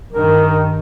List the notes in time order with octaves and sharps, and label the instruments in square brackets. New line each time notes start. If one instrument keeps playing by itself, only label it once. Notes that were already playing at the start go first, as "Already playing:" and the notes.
[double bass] G2 D#3 [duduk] A#4